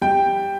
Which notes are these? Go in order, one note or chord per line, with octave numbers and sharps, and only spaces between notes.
G3 G5